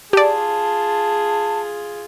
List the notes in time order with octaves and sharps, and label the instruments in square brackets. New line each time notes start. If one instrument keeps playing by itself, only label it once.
[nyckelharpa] F4 G#4 [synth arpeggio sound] G4 D5 [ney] A5